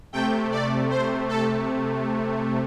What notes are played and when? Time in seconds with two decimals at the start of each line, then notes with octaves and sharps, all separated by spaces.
0.13 C3 A3 G5
0.51 D5
0.90 C5
1.29 A4